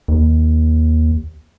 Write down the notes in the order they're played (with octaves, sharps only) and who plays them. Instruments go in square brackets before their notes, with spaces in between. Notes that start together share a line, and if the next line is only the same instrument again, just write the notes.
[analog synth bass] D#2